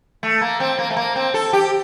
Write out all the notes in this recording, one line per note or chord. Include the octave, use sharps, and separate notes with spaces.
A3
A#3
C4
A#3
A3
A#3
C4
A4
G4